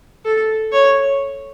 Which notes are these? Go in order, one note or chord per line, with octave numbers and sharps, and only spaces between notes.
A4
C#5